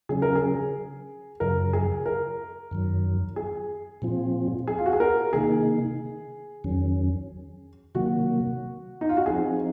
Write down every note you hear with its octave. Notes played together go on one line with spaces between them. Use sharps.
C#3 F#3 C#4 G#4
A#4
G#4
F#2 C#3 F#3 A#4
G#4
A#4
F#2 D#3 F#3
G#4
A#2 F3 C4 F4
G#4
F4
F#4
G#4
A#4
C3 D#3 A#3 D#4 G#4
F2 D#3 F#3 C#4
C3 D#3 F#3 A#3 F#4
D#4
F4
F#4
F3 C4 D#4 G#4